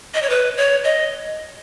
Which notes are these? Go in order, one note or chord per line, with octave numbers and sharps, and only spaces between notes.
D#5
C#5
B4
C#5
D#5